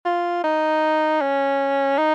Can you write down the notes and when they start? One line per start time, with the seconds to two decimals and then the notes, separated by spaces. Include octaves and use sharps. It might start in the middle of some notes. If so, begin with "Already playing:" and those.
0.05 F4
0.44 D#4
1.21 C#4
1.98 D#4